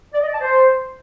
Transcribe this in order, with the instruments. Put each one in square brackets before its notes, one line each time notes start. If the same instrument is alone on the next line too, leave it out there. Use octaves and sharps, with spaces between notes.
[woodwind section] D5
D#5
D5
A5
C5